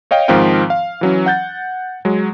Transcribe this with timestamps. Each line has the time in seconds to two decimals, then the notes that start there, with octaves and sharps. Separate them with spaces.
0.11 C#5 D#5 F5 G5
0.28 G#2 D#3 F3 C4 F5 G5
0.70 F5
1.01 E3 F#3 C#4
1.26 F#5 G6 A6
2.05 F#3 G#3